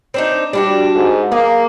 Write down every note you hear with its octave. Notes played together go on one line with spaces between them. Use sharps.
C4 D4 D#4
G3 D4 E4 F#4
G#2
A#3 G#4